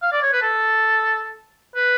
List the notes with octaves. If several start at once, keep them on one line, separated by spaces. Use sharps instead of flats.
F5
D5
C#5
B4
A4
B4